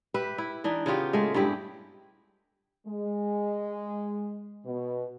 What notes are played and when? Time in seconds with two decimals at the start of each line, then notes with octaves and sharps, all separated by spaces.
0.14 G4 B4 E5
0.38 E4
0.64 E3 D4 D#4
0.86 C#3 B3 F4 G4
1.13 G#3 A3
1.34 G2 G#3 E4 G4
2.86 G#3
4.65 B2